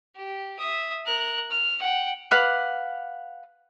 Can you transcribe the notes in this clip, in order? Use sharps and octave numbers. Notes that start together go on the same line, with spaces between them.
G4
E5 D#6
A#4 F#6
F6
F#5 G5
B4 F5 F#5 D6